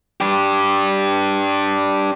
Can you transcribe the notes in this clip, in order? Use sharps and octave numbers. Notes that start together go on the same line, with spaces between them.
D4 G4